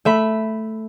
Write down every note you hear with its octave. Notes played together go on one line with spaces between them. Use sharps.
A3 E5 B5